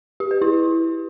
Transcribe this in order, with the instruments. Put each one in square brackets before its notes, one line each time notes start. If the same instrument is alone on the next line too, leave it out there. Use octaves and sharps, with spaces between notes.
[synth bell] G4
B4
E4